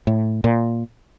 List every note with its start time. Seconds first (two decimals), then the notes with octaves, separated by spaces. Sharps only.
0.07 A2
0.44 A#2